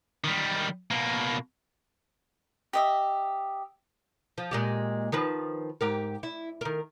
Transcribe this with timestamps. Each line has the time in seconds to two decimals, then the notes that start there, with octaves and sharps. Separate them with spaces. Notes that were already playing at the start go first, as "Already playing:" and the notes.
0.24 D#3 G3
0.91 B2 A#3
2.73 G4 D#5 E5
4.38 F3
4.51 A#2 G#3 G4
5.12 D#3 F3 B4
5.81 G#2 G4 A#4
6.23 E4
6.61 D#3 A#4